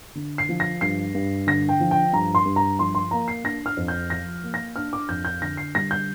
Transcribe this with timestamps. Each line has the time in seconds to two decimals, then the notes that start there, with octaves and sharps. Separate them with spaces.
0.15 D3
0.38 C7
0.49 F3
0.60 A#6
0.81 G2 C7
1.15 G2
1.47 D3 A#6
1.69 G5
1.80 F3
1.91 G5
2.13 G2 A#5
2.35 C6
2.45 G2
2.56 A#5
2.79 F3 C6
2.95 C6
3.11 A#3 A#5
3.28 C7
3.44 D4 A#6
3.66 F6
3.77 F2
3.88 G6
4.10 F3 A#6
4.43 A#3
4.54 A#6
4.76 D4 F6
4.93 D6
5.08 F2 G6
5.25 G6
5.42 D3 A#6
5.57 C7
5.75 G3 A#6
5.91 G6